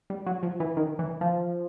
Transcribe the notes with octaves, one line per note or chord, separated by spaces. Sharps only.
G3
F#3
F3
E3
D#3
E3
F3